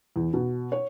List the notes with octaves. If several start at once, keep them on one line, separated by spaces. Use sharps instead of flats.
E2
B2
C#5